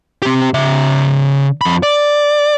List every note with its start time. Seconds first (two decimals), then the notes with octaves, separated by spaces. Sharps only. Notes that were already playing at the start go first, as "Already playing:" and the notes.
0.22 C4 G4
0.54 C#3 E5
1.61 F2 B5
1.83 D5